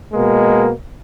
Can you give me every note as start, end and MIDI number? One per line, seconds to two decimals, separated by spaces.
0.13 0.70 47
0.13 0.70 56
0.13 0.70 58